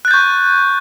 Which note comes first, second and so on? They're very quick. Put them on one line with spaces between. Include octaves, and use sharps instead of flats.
F#6 A6 G6 C#6